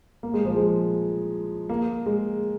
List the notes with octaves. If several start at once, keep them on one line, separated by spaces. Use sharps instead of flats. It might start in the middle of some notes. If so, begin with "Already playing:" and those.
A#3
G#3
F3
G#3
A#3
G#3